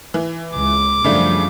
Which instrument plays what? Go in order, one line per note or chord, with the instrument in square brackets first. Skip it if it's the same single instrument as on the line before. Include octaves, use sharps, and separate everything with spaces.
[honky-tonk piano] E3
[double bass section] C#2 [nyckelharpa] D6
[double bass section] F#2 F3 G3 [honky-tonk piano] C#3 A3 D4